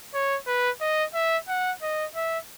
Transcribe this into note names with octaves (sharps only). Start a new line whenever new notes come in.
C#5
B4
D#5
E5
F#5
D#5
E5